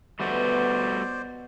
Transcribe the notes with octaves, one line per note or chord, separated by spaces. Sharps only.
B2 G3 A3 F#4 C5 D5